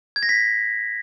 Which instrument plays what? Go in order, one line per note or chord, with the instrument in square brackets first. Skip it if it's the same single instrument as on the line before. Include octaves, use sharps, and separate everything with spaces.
[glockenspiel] G#6
A#6
B6